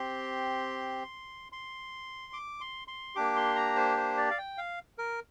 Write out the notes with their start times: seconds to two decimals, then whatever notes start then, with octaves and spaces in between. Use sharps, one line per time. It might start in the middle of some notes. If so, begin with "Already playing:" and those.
Already playing: C4 G4 C6
1.52 C6
2.33 D6
2.61 C6
2.88 C6
3.16 A#3 D4 G4 D6
3.36 C6
3.55 A#5
3.76 C5
3.97 C5
4.17 D5
4.31 F5
4.38 G5
4.58 F5
4.98 A#4